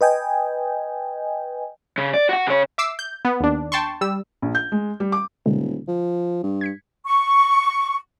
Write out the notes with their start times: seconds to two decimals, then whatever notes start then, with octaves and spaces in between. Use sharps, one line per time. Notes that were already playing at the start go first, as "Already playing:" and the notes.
0.01 B4 D#5 G5 G#5
1.98 C#3
2.14 D5
2.29 F#4 F#5
2.47 C#3 C#5
2.78 E5 D6 E6 C7
2.99 G6
3.25 B3
3.40 D#2 D4
3.72 G5 A5 C6 C#6
4.01 G3 E6
4.42 A#1
4.55 G6
4.72 G#3
5.00 G3
5.12 D6
5.46 D#1 B2 D3 G#3
5.88 F3
6.43 G2
6.61 G#6 B6 C#7
7.05 C#6